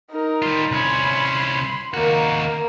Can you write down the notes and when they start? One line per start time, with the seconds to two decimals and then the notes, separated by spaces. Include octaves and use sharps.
0.11 D#4 A#4
0.42 G3 F4
0.71 C2 C#4 B5 C6
1.94 D#2 A#3 F#4 A#4